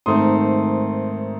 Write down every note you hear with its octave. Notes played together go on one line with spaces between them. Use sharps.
G#2 D#3 A3 C4 C6 D#6